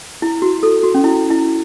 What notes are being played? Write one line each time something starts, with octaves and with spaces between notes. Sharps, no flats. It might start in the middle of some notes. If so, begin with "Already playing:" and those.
E4
F#4
A4
F#4
C#4
E4
E4